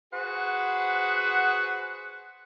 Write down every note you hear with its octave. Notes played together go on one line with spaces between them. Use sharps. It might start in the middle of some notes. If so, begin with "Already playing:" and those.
F#4 G#4 B4 C5 F#5